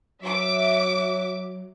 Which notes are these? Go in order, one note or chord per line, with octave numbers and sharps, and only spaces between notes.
F#3 E5 D6